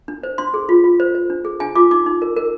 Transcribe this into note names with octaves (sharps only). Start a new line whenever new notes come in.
D4
C5
D4 C6
G#4
F4
F4
C5
C5
D4
G#4
D4 G#5
F4 D6
D#4 D6
D#4
A#4
A#4